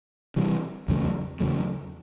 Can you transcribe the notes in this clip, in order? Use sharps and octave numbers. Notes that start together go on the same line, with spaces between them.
C3 E3 G3
E2 C#3 F#3 A3
E2 C#3 F#3 A3